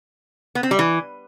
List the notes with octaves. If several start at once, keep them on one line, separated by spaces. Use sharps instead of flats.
B3
C4
G3
E3